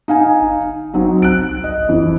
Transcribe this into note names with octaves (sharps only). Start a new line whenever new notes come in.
D#4 F5 G#5
G1
F#3 C4 D#4
C2 F#6 D7
F#1 D#5
F#1 F2 E3